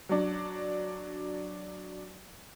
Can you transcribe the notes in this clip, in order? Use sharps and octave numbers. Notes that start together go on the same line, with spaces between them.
F#3 D4